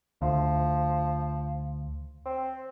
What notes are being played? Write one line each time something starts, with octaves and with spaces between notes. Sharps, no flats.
D2 F3
C4